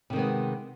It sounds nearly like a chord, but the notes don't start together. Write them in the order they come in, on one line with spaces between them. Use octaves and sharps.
C3 D#3 G#3 B3